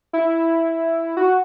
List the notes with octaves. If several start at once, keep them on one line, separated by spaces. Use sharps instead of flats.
E4
F#4